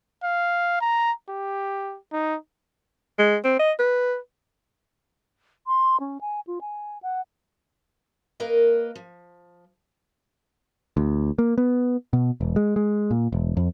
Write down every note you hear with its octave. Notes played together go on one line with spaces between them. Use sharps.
F5
A#5
G4
D#4
G#3
C4
D#5
B4
C6
C#4
G#5
F4
G#5
F#5
A#3 A#4 B4 D#5
F3
D2
A#3
B3
B2
E1
G#3
G#3
A#2
E1
F2